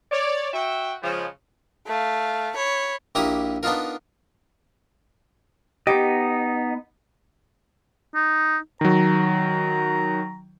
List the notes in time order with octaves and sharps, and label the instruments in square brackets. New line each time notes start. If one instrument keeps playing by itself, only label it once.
[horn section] C#5 D5
F#4 E5 G5
C#3 F3 G#3
[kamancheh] A3 F5
C#5 B5
[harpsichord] A#1 A#3 E4 G4 A#5 D#6
B3 D4 D#4 F4 A#4
[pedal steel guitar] B3 D#4 D#5 [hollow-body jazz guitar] G4
[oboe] D#4
[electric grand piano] D#3 F#3 [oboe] A#5